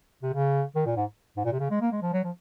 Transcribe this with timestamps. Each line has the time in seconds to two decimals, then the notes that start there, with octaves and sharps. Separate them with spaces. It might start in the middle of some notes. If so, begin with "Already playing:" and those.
0.23 C3
0.33 C#3
0.75 D#3
0.86 A#2
0.96 G#2
1.37 G#2
1.45 A#2
1.52 C3
1.60 C#3
1.71 G#3
1.81 A#3
1.92 G#3
2.02 F3
2.13 F#3
2.23 F3